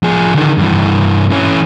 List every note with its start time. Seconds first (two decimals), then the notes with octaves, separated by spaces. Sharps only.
0.03 F3 G#4
0.35 D3 D#3
0.58 G2 E3
1.31 E3 C#4